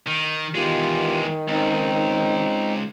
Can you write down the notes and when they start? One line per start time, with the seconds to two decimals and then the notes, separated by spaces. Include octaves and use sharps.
0.07 D#3
0.55 E2 D#3 G#3 F4 G4
1.48 C#2 C4 D#4